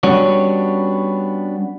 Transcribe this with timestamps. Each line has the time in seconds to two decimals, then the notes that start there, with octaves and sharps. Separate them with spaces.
0.03 G3 B3 C#4 D4 F#4 C#5